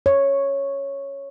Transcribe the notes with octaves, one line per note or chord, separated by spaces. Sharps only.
C#5